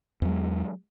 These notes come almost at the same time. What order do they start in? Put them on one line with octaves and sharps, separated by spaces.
E2 F#3 G#3